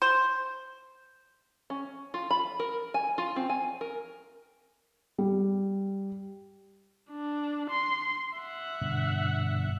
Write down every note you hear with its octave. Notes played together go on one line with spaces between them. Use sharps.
C5
C#4
F4
B5
A#4
G#5
F4
C4
G#5
A#4
G3
D4
C6
E5 F#5
G2 B2 D3